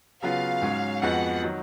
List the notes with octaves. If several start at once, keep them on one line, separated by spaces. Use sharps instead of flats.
C#3 F#3 B3 F4 F5
G#2 F#3 C#4
F2 F3 G#3 B3 F#4 F#5
D#3 F#3